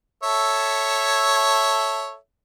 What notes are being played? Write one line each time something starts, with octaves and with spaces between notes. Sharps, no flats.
A4 C#5 E5